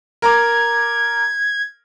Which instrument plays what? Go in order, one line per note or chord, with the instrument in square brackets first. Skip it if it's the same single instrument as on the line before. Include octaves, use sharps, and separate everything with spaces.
[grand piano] A#4 A#5 D6 [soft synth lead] G#6